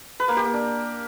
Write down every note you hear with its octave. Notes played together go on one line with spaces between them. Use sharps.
B4
A#3
G4
A#3
D4